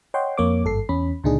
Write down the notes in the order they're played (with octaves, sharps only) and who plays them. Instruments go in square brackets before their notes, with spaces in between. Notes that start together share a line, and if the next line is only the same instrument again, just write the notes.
[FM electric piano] C#5 D#5 F#5 G5 C6
F2 A#3 C#5 D6
G#1 G2 A4 C7
E2 C#4 B5
C#2 A#2 D3 D4 D#4 G#4